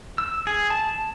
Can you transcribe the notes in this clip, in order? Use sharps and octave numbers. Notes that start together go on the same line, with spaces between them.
E6
G#4
A5